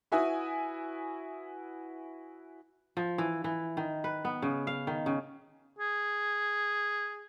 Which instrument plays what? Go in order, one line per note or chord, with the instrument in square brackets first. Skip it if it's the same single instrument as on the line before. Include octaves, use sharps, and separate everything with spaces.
[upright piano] E4 F#4 B4 E5 G#5 D#6
[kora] F3
E3
E3
D#3
B4
B3
C#3
F5
D#3
C#3
[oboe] G#4